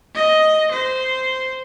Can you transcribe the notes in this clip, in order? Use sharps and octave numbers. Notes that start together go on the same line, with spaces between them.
D#5
C5